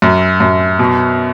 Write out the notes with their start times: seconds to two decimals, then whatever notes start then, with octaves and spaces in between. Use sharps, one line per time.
0.02 F#2
0.40 F#2
0.79 B2